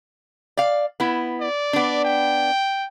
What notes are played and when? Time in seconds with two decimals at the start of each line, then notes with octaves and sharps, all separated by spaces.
0.57 D5 F5
1.00 B3 E4
1.41 D5
1.73 B3 D4
2.05 G5